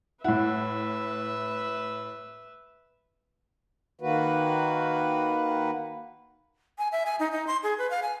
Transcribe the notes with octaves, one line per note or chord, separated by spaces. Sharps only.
A2 E4 B4 E5 F#5
D#3 A#3 F#4 B4
G#5
E5
G#5
D#4
D#4
C6
G#4
B4
F5
G#5